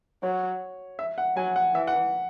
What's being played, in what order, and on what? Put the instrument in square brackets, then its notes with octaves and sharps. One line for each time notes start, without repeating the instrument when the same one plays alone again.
[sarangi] F#3 [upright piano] C#5
[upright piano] E5
F#5
[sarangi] F#3 [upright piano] G#5
[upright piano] F#5
[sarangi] E3 [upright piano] E5
[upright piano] F#5